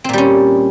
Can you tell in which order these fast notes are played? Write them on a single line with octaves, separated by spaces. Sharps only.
C4 A#2 G3 C#4